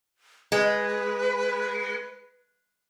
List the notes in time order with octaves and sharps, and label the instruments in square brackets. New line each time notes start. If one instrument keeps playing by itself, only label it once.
[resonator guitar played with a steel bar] G#3 [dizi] B4